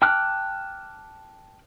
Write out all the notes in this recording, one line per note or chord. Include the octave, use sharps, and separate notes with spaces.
G5 A5 D6 F6 F#6